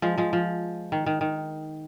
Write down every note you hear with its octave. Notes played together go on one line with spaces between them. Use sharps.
F3 G#3
F3 G#3
F3
D#3
D#3
D#3